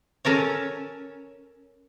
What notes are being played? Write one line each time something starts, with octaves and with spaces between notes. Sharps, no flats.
C#4 A4 A#4 C#5